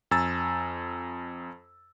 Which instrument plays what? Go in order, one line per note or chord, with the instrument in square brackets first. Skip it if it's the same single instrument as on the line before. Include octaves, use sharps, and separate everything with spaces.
[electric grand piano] F2 G#5 A#5 E6 A6